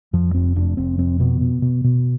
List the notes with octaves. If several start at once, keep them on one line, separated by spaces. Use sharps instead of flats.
F2 F3
F1 C4
F1 D4
F1 C4
F2 C4
B2 B3
B2
B2
B2